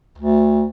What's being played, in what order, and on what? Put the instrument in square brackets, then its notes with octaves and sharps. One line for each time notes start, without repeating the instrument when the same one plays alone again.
[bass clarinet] D2